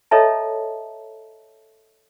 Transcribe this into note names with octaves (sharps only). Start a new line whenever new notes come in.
A4 C#5 D#5 E5 A5 A#5